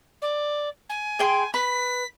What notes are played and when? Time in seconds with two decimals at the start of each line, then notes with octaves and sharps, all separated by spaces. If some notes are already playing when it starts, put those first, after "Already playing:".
0.22 D5
0.90 G#5
1.19 G#4 G5 C6
1.54 B4 B6